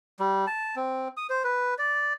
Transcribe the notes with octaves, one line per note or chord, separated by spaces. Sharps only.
G3
A5
C4
D#6
C5
B4
D5